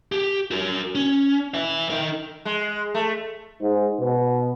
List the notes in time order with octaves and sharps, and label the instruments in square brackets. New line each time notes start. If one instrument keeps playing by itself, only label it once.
[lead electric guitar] G4
F#4 A#4
C#4
B4 E5
D#4 A#4
[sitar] G#3
A3
[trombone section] G#2
B2